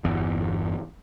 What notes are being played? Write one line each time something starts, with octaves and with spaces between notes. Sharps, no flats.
G1 E2